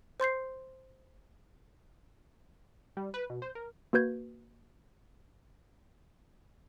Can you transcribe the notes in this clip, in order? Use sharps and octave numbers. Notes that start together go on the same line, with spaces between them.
C5 C6 G6 C7
G3
B4
B2
C5
A#4
A#3 F#4 B4 G6 G#6